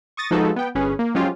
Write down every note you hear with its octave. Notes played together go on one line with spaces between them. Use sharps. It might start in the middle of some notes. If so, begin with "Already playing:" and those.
C#6 D#6 A6 A#6
F3 G#3 D#4 F#4 A4 B4
B3 G5
G1 C#4 G#4 B4
A#3
F3 F#3 G#3 C#4 F4 G4